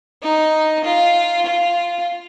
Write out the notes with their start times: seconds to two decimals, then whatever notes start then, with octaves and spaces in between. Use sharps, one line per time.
0.22 D#4
0.84 F4
1.46 F4